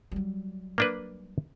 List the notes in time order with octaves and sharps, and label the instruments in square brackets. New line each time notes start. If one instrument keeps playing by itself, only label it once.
[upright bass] F#3 G3
[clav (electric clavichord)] A#3 D4 B4